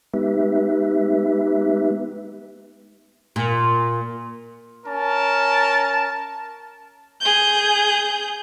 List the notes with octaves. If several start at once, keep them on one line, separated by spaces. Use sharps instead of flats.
G#3 B3 D#4 G4 B4 E5
A#2
C#4 A#4 A5
G#4 G6